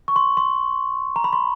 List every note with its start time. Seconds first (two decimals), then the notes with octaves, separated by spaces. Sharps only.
0.08 C#6
0.16 C6
0.37 C6
1.16 A#5
1.24 B5
1.33 C6